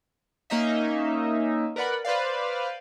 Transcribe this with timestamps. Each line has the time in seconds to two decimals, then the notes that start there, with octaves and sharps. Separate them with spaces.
0.50 A#3 C#4 D#4 D#5 E5
1.76 A#4 B4 D5 F#5 B5
2.05 B4 C5 D5 F5